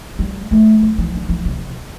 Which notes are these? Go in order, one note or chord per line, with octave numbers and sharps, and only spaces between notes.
G3
A3
G3
E3
D3
E3
C3